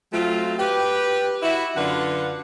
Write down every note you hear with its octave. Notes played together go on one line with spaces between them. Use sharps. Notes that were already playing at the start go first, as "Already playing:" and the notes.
F#3 A3 C4 F4
G4 B4
E4 F#4 E5
F#2 D3 D4 F4 B4 F#5